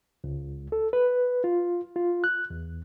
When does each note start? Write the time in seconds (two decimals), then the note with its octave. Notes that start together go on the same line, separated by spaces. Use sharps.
0.24 C#2
0.72 A4
0.93 B4
1.44 F4
1.96 F4
2.24 F#6
2.50 E2